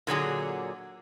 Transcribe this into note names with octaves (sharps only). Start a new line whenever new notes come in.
A#2 D3 F#3 G#4